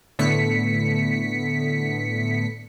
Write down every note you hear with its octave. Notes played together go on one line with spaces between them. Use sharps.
A2 D3 A3 B3 B6 C#7